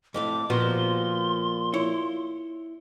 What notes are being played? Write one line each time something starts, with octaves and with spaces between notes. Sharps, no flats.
F2 A2 A3 D6
A#2 F3 B3 F#4 C6
E4 C#5